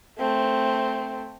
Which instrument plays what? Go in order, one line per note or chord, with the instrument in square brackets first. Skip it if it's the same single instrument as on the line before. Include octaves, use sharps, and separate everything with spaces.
[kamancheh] A3 C4